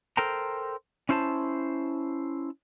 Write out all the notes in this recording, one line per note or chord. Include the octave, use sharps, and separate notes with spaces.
A4 A#4 C5 G5 A#5
C#4 E4 C5 F#5 A5